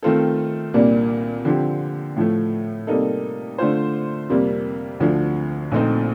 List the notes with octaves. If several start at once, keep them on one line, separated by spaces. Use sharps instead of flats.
D#3 A3 C4 F4 A4
C2 A#2 G3 A#3 D4
D3 F3 C4 G4
A2 F3 A3
C3 G3 A#3 D#4 A4
D3 A3 D4 F4 C5
F2 C3 G3 A#3
D2 D3 F3
A#1 A#2 A3 C4 D#4